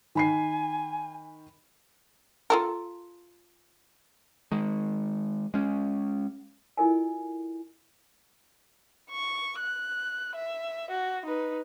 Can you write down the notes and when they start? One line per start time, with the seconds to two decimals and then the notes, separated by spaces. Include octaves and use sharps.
0.15 D#3 G#5 B5 C7
2.50 F4 A4 A#4
4.52 D#3 G#3
5.54 G#3 C#4
6.77 E4 F4 A4 A#4 D#5 G#5
9.10 C#6
9.59 F#6
10.35 E5
10.91 F#4
11.26 D#4 B4